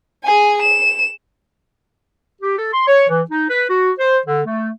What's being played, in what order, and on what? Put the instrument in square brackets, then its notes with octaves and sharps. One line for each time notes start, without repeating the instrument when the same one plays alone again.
[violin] G#4 G#5
E7
[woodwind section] G4
A4
C6
C#5
E3
D#4
B4
F#4
C5
D3
A3